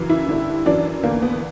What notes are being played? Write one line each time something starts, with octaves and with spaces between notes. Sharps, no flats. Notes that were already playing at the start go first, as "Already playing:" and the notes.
Already playing: F#2 C#3 E3
E4
G2 D3
F#2 E3 D4
E2 D3 A#3
B3